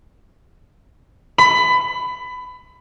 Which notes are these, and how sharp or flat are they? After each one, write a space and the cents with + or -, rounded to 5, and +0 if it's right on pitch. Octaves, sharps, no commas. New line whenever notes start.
B5 +20